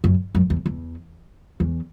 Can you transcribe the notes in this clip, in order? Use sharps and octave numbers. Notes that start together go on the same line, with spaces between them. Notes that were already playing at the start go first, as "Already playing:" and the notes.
F#2
F#2
E2
E2
E2